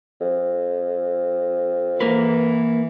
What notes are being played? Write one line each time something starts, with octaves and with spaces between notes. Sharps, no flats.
F2
E3 A#3 A#4 B4